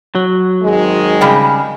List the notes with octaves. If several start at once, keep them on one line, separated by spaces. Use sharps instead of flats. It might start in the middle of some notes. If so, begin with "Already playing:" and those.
F#3
G#1 D#3 G#3
C#3 G3 G5